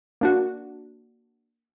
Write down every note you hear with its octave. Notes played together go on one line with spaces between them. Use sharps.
A#3 D4 F#4